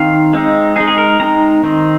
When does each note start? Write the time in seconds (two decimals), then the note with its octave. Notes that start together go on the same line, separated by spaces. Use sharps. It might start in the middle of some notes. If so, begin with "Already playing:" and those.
Already playing: D#3 C4 D#4 F5
0.33 G#3 C4 D#4
0.76 G#3 D#4 G#4
0.88 G#4
0.98 A#4
1.19 G#3 C4 D#4 A#5
1.63 D#3 C4 D#4